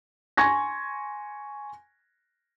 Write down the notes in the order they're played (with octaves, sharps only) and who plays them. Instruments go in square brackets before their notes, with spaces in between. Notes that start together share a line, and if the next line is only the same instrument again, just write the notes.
[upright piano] G#5 C6 C#6 G#6 A#6